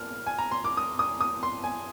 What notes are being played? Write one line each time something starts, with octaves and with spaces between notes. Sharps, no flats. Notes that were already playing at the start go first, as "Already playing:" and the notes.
Already playing: A#3 F6
G#5
A#5
C6
D6
D#6
D#6
D#6
C6
G#5